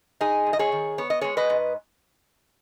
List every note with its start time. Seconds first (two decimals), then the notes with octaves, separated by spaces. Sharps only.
0.21 G#3 D#4 G#4
0.47 G#2
0.53 D#5
0.59 G#4 C#5
0.72 D#3
0.98 B3 C#5
1.10 D#5
1.21 G#3 G#4 C#5
1.37 B4 D#5
1.50 G#2